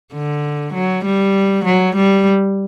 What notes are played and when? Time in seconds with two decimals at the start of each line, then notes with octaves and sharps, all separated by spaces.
0.13 D3
0.74 F#3
1.05 G3
1.65 F#3
1.96 G3